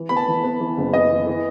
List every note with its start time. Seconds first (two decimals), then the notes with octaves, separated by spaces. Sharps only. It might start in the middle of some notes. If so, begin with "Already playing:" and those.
Already playing: E3
0.09 B3 B5
0.16 A5
0.28 E3
0.44 B3
0.60 E3
0.77 F#1
0.93 B3 D#5
1.10 E3
1.27 E3